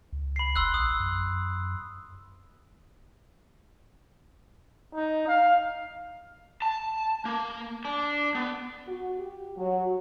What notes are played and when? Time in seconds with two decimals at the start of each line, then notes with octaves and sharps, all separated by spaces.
0.13 C#2
0.36 B5 C7
0.56 F1 C6 E6 F#6
0.74 A#1 D#6
1.00 F#2
4.95 D#4
5.28 F5
6.62 A5
7.25 A#3
7.85 D4
8.35 B3
8.87 F#4
9.18 G4
9.57 F#3